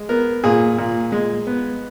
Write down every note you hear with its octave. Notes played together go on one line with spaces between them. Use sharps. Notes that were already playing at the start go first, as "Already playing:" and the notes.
Already playing: G#3
B3 A#4
A#2 G#4
A#2
G#3
B3